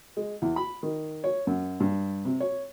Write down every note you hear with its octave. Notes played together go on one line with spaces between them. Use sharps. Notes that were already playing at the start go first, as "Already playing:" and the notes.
G#3
E2
B5
D#3
C#5
F#2
G2
C3
C#5